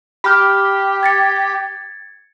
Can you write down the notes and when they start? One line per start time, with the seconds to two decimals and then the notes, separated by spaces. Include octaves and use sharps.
0.24 G4 B5 F6
1.03 G#6 A6 C#7